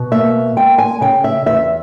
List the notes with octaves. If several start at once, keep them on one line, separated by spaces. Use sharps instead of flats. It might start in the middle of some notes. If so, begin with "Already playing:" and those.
Already playing: B2
A#3 E5
G#3 G5
G#5
C#3 G5
E5
E2 E5